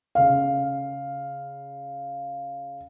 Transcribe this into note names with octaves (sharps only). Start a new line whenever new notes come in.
C#3 F5